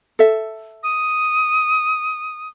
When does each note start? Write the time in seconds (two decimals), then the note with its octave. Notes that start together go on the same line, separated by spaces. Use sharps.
0.19 A4 E5
0.83 D#6